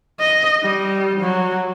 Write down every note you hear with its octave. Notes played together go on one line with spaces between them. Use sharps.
D#5
G3
F#3